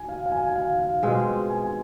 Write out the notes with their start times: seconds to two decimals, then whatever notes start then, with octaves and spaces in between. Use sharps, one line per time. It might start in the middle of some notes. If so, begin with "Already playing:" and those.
Already playing: G#5
0.09 F5
0.26 F5
0.32 G#5
0.49 G#5
0.56 F5
0.79 F5
1.03 B2 G#3 C4 F4 G#5
1.50 G#5